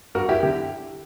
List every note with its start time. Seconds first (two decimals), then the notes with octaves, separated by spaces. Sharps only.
0.15 G2 F#4 A#4
0.29 E4 G4
0.43 D3 E4 G4